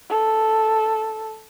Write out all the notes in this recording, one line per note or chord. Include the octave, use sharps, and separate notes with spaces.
A4